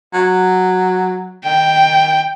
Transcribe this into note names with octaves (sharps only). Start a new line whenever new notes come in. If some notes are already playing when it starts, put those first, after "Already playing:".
F#3
D#3 G5